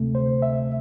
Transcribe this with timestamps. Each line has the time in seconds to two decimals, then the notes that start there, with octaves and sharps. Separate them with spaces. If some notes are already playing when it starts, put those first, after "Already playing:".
Already playing: D2 C3 A3
0.15 C5
0.42 E5